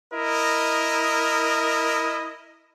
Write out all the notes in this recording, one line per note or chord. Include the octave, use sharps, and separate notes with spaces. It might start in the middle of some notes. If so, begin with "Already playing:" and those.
E4 A#4 D#5